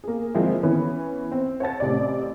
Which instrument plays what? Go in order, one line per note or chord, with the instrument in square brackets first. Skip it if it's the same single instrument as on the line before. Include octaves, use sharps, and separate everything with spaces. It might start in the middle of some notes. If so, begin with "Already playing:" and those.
[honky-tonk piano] A#3 G#4
F3 G#3 A#3 C4 E4
E3 B3 C#4
C4
C#5 F#5 A5 A6
A1 C3 D5